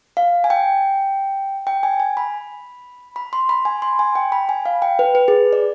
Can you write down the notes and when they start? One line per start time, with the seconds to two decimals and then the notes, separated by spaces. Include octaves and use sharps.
0.17 F5
0.44 G#5
0.50 G5
1.67 G5
1.83 G#5
2.00 G#5
2.17 B5
3.16 B5
3.33 C6
3.49 B5
3.65 G#5
3.82 C6
3.99 G#5
4.15 G5
4.32 B5
4.49 G#5
4.66 F5
4.82 G5
4.99 B4
5.15 B4
5.28 G#4
5.53 D5